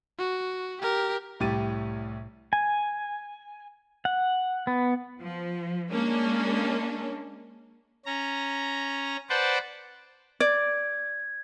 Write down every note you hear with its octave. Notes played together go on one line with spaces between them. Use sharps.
F#4
G4 A#4
C2 A2 G3 G4 A6 D#7
G#5
F#5
B3
F3
G#3 A#3 C#4 D4
C#4 A#5
B4 C5 D5 F#5 G5 A5
D5 G#6